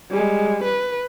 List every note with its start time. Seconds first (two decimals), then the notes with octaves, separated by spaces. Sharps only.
0.11 G3 G#3
0.64 B4